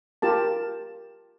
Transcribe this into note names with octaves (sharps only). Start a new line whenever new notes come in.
F4 G4 A#4 A5